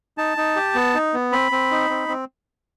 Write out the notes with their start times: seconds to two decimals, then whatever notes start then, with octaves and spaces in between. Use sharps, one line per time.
0.18 D#4 A5
0.37 D#4
0.56 G4
0.75 B3
0.95 D#4
1.14 B3
1.32 C4 B5
1.52 C4
1.71 D#4
1.90 C4
2.08 C4